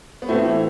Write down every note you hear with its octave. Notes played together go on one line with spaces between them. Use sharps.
B3
A2 A3 C4
E3